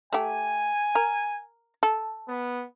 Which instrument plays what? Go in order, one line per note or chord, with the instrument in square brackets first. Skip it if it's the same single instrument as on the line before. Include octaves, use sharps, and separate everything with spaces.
[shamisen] A3 G4 [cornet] G#5
[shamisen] A#4
A4
[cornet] B3